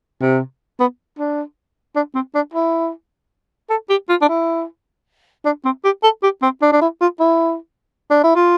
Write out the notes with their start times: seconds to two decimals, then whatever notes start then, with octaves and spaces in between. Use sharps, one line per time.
0.21 C3
0.80 B3
1.19 D4
1.95 D4
2.15 C4
2.34 D4
2.54 E4
3.70 A4
3.89 G4
4.09 F4
4.21 D4
4.28 E4
5.45 D4
5.65 C4
5.84 G4
6.03 A4
6.22 G4
6.42 C4
6.62 D4
6.72 D4
6.81 E4
7.01 F4
7.20 E4
8.10 D4
8.23 E4
8.35 F4